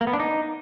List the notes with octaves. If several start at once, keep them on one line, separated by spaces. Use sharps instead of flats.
A#3
B3
D4
D#4